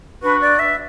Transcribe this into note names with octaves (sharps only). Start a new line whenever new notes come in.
D4 F#4 B4
D5
E5